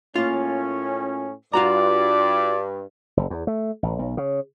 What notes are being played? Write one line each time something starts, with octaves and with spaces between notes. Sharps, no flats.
A2 A#3 C#4 F4
G2 F4 F#4 D5 A#5
F#1
E2
A3
A1
B1
C#3